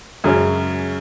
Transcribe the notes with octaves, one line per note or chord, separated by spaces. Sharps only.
F#2 C#3 G#3 C#4